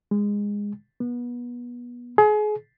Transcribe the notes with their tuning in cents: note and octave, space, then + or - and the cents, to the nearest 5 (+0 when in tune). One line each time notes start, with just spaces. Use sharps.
G#3 -15
B3 -25
G#4 +30